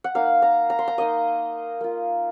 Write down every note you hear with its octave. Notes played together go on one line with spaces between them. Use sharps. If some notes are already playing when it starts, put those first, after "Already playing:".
F#5
A#3 D#4 F5
A#5
A#5
C6
A#5
A#3 D#4 D#5
A#3 F4